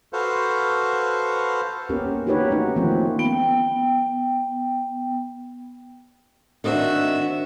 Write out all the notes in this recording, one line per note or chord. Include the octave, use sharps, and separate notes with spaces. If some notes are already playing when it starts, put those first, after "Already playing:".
F#4 A4 B4 C5 F5
A#3 B3 C#4 G4 A#4
D4 D#4 F#4 G4 B4 C#5
A3 C#4 D#4 F#4
D#3 F3 A3 A#3 C4 C#4
A3
B3 G5
D#3 C4 D4 F#4 E5